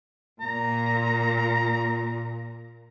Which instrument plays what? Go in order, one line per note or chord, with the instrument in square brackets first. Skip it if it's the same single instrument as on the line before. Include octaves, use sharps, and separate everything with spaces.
[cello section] A#2 [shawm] A#5